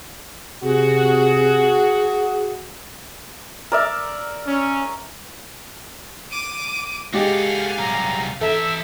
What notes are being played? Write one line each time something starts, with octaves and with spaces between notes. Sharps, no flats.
C3 F#4 G#4
A#4 D5 E5
C#4
D6 D#7
G#3 F#4 G4 A4 F5 G#5
C2 F#3 A#5
E3 A4 E5 A#5